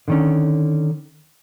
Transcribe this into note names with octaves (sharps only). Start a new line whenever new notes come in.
D3 D#3 C#4